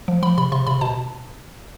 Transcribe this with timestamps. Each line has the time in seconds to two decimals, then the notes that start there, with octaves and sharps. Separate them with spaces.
0.08 F3
0.23 F3 B5
0.38 C3 B5
0.52 C3 C6
0.67 C3 B5
0.81 B2 A5